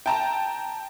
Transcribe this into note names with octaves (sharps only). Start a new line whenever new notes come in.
G5 A5 A#5